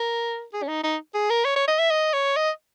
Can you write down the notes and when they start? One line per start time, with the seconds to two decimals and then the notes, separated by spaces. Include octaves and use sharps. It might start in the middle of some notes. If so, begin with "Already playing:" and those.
Already playing: A#4
0.54 G#4
0.63 C#4
0.68 D#4
0.84 D#4
1.15 G#4
1.30 A#4
1.45 C#5
1.56 C#5
1.68 D#5
1.79 E5
1.91 D#5
2.13 C#5
2.37 D#5